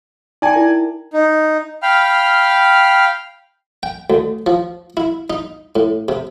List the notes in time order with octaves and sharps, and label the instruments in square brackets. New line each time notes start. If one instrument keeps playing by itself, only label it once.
[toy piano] D#4 G5 [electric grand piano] D5 G#5
[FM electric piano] E4 A#4 A#5
[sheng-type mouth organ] D#4
F5 G5 B5 F6
[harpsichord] G5
D2
F3
E4
D#4
A2
C3